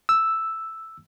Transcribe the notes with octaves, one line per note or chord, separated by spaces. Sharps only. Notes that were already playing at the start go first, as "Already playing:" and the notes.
E6